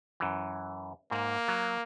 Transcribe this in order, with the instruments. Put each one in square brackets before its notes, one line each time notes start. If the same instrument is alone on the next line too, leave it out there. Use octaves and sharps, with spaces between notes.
[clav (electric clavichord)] F#2 E3
[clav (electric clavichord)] G#2 [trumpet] A#3
[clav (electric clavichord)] F#3